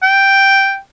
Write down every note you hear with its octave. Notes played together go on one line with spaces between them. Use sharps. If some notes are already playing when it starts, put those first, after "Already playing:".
G5